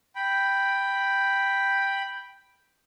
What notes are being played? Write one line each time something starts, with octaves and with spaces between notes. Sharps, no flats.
G5 B5